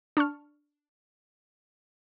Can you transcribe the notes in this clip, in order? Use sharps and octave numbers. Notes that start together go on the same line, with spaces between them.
D4 A5 C#6 F6